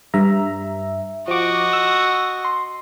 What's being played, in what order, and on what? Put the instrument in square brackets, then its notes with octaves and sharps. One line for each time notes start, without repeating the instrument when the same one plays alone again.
[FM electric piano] G2 E5 A#5
[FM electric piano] F3 D6 [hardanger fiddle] F#4 D#5
[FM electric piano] E6
C6